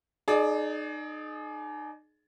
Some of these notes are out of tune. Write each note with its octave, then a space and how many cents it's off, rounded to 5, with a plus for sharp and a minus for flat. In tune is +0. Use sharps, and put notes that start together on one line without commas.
D#4 -30 G#4 +30 D5 -5